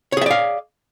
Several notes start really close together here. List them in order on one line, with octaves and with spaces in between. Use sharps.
C#5 G#4 E5 D5 F5